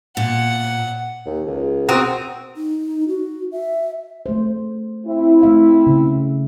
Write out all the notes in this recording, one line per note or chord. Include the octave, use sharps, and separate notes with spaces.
A#2 F#5
D#2
C#2
C4 F#4 A#4 D#6
D#4
F#4
E5
A3 C5
C4 E4
A3 E5 F5
C#3